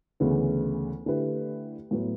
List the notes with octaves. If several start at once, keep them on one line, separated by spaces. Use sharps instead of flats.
D2 C#3 E3 B3
D3 A3 E4 G4 B4
A2 F#3 B3